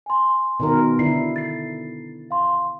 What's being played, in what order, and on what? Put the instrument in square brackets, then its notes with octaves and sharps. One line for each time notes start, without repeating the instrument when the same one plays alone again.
[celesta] G#5 C6
[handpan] B2 D#3 A#4
[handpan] D3 E4 [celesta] C7
[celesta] A6 C7
F5 C6